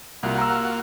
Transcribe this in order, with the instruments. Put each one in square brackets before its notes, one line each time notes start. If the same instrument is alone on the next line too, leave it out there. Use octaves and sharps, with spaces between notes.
[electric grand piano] C2 [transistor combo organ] A#3 F4 F#4
[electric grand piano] A#5 E6